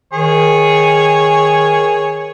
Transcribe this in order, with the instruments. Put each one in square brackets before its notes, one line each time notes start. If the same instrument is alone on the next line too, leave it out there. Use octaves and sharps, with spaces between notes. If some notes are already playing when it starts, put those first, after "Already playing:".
[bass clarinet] D#3 [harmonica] G#4 C#5